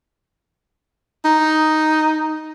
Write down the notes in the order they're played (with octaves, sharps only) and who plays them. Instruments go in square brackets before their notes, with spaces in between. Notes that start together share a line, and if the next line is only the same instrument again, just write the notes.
[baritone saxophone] D#4